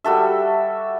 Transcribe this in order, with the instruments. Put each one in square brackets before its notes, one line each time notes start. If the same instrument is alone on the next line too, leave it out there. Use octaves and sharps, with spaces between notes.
[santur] G3 F#4 A4 E5